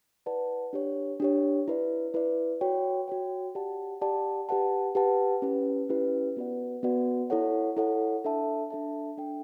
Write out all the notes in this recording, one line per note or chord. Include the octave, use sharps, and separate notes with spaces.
E4 B4 D5 F#5 A5
D4 G4 C#5
D4 G4 C#5
E4 B4 D5
E4 B4 D5
F#4 C#5 G5
F#4 C#5 G5
G4 D5 F#5 A5
G4 D5 F#5 A5
G4 B4 F#5 A5
G4 B4 F#5 A5
C#4 E4 G4 B4
C#4 E4 G4 B4
B3 F#4 B4 D5 F#5
B3 F#4 B4 D5 F#5
E4 A4 C#5 F#5
E4 A4 C#5 F#5
D4 A4 E5 A5
D4 A4 E5 A5
D4 A4 E5 G5